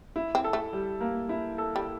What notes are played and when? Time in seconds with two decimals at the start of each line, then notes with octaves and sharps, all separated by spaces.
0.16 E4
0.35 C4
0.44 A4
0.53 A3
0.73 G3
1.01 A#3
1.29 E4
1.58 A4
1.76 G3